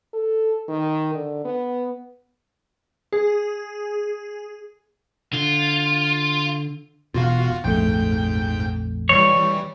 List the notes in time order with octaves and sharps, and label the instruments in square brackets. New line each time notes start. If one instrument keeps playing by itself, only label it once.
[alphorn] A4
D#3
D3
B3
[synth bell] G#4
[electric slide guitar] D3 [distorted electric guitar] F4
[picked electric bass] E1 B2 [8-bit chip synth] F4 F#4 F5
[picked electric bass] A#1 F2 A3 [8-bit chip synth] G#2 G5 G6
[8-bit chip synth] E3 G3 [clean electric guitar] C#5